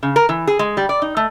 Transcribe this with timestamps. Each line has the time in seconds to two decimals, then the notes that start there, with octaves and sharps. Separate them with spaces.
0.03 C#3
0.16 A#4
0.29 E3
0.47 G#4
0.59 G#3
0.77 G3
0.89 D5
1.02 D#4
1.17 A3